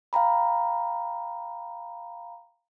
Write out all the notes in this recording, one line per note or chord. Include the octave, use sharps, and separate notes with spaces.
F5 G5 A#5 B5